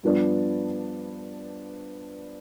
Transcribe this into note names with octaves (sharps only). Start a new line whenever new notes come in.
G2 F3 B3 D4